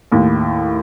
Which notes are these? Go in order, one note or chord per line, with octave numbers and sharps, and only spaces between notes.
D#2 A2